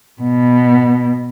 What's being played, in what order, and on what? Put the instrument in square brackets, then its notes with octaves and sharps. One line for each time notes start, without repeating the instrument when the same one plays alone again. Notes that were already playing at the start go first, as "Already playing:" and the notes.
[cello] B2